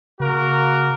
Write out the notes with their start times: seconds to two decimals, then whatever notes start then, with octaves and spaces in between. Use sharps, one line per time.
0.20 C#3 A#3 F#4 A#4